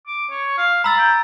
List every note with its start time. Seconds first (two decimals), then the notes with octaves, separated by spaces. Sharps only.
0.07 D6
0.30 C#5
0.58 F5
0.84 A#5 B5 E6 A6
0.98 G5